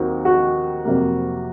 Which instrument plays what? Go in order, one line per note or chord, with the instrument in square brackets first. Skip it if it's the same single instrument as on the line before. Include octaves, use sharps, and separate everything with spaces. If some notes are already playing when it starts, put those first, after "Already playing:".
Already playing: [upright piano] D#2 D#3 F#3 C4 D#4 [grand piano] F#4
[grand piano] F#4
[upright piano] F2 C3 F#3 A#3